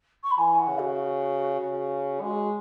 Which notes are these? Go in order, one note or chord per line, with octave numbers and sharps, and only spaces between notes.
C#6
B5
E3 G#5
F#5
C#3
F#4
C#3
G#3 F#4